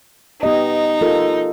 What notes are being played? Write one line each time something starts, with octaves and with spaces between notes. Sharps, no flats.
B3 D#4 G4 D#5
F4 A4 A#4